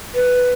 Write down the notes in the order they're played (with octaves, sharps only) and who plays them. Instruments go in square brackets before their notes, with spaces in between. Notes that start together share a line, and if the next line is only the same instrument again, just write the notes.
[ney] B4